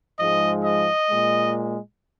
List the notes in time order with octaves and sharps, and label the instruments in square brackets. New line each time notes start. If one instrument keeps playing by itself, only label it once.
[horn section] G#2 F3 G#3 D#5
D#5
A#2 G#3